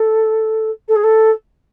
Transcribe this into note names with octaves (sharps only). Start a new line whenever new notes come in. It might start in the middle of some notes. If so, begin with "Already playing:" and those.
Already playing: A4
A4
G#4
A4